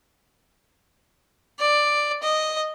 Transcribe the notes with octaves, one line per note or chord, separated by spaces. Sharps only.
D5
D#5